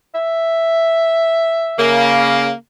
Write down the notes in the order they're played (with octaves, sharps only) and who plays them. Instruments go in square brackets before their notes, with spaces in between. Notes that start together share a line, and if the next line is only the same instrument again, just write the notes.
[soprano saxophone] E5
[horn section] C#3 A#3